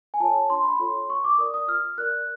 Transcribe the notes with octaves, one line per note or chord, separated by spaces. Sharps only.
G#5
F4 A4 C#5 A5
D4 C6
B5
F4 A4 C#5 C6
F4 C#6
D6
A#4 D5 D#6
D#6
F4 F6
A#4 D5 F#6